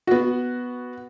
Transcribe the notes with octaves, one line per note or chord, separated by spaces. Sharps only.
B3 F#4